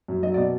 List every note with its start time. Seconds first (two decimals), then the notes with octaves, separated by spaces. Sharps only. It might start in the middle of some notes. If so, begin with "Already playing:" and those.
0.08 F#2
0.23 F#3 D#5
0.34 B2 D5